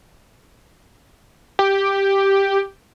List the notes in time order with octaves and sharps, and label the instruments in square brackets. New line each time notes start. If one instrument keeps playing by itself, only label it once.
[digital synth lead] G4